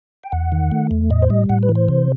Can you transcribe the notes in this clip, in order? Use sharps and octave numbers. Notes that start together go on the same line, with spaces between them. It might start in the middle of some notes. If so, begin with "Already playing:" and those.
G5
E2 F#5
D#3
A3
E2
A2 D#5
C5
G3 D#5
A2 F#5
B4
E3
C5
C3